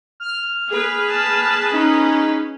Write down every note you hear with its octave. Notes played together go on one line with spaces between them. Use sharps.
F6
G#4 B4
A5
C#4 D#4